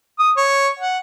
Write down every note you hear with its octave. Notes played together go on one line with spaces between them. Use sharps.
D#6
C#5
F#5